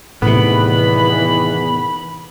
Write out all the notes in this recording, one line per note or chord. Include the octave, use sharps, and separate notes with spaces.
E2 A2 C3 D#3 E3 B3 B5